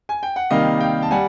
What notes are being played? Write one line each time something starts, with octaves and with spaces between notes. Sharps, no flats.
G#5
G5
F#5
C3 D#3 G3 A#3 D#5 F5
F5 G5
A5
G3 F#5 G#5